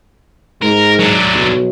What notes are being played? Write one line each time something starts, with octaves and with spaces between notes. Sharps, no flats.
G#2 A#4
F#3 D4
B1